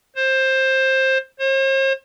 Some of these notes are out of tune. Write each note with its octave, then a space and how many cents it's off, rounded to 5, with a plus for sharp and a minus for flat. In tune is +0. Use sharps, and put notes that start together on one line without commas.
C5 +15
C5 +45